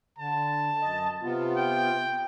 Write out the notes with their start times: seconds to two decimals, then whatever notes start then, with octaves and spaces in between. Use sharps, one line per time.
0.19 D3 A5
0.82 F#2 D#5
1.23 C3 B3 F4
1.57 G5